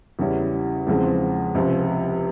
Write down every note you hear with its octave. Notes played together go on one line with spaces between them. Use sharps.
E2 C#3 G3 C#4 E4
E2 C#3 F3 G#3 C4
C#2 C3 F3